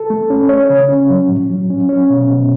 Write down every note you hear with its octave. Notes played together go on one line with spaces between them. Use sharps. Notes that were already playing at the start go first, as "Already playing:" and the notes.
Already playing: A4
A3
C#4
C#5
C#3
C#4
F#3
A2
F#3
C#4
C#4
B2
B2